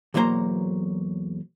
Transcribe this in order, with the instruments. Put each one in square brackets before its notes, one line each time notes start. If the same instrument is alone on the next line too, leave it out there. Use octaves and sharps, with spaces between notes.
[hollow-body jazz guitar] B1 E2 F#3 A#3 C5 A#5